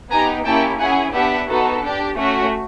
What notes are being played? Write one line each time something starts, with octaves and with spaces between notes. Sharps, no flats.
B3 D#4 G4 G#5 A#5
A#3 C#4 E4 G4 G5 A5
C#4 E4 G#4 F#5 G#5
B3 D4 G4 E5 F#5
B3 D#4 F#4 A4
D4 G4
A3 C#4 F#4